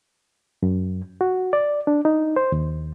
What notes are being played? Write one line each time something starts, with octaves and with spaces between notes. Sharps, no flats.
F#2
F#4
D5
D4
D#4
C5
D#2